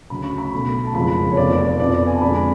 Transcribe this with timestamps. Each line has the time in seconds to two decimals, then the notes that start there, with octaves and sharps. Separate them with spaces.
0.10 D2 C#3 F#3 C#4 B5
0.24 C#6
0.38 B5
0.53 B1 B2 A3
0.87 A5
0.95 F#1 F2 F3 G#3 B5
1.31 C#5
1.37 F1 F2 F3 B3 D5
1.58 D5
1.80 F2 F3 B3 D5
2.07 G#5
2.15 A5
2.21 F2 D3 F3 G#3 B5